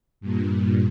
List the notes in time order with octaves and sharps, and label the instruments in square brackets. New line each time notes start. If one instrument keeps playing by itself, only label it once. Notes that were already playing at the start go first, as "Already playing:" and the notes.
[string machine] G2 A#2